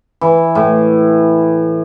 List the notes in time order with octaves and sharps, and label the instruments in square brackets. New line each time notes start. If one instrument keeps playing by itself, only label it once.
[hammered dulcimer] E3
A2